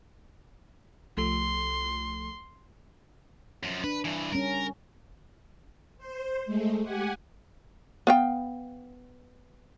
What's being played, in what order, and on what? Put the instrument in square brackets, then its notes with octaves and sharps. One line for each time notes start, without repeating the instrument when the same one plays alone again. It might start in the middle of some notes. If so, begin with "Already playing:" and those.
[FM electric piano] C2 F3 A3 [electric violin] C6
[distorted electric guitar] F#2 F3
[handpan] D4 [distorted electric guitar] B4
[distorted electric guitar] G2 E3
[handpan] G3 C#4 [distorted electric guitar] A#4
[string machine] C5
G#3 A3
G4 F#5 G#5
[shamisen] B3 F5 G5